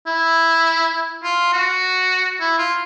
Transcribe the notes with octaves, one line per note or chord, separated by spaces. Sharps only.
E4
F4
F#4
E4
F4